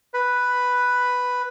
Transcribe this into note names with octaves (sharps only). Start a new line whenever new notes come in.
B4